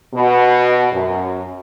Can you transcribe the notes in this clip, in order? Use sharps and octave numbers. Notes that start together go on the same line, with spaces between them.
B2
F#2